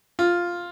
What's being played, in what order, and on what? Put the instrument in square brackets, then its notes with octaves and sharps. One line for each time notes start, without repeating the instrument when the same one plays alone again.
[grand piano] F4